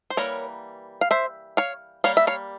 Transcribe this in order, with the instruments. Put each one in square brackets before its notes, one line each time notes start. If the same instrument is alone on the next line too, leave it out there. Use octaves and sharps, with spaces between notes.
[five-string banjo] C5
E3 G3 A#3 A#4 C#5
F5
C5 E5
C#5 F5
G3 A#3 C#5 F5
E5
C#5 F5